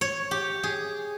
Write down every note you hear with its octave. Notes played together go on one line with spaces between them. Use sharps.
C#5
G4
G#4